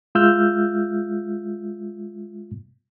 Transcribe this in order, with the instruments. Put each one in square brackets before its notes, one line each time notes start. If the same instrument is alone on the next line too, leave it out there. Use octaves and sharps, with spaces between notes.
[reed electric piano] G#3 F4 E5 E6 F6 G6